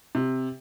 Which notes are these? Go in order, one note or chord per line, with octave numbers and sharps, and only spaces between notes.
C3